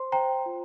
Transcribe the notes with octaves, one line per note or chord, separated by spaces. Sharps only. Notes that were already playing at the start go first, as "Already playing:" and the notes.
Already playing: C5 C6
C5 G5 A#5
F4